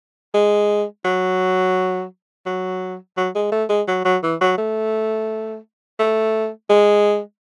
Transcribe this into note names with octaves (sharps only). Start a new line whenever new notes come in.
G#3
F#3
F#3
F#3
G#3
A3
G#3
F#3
F#3
E3
F#3
A3
A3
G#3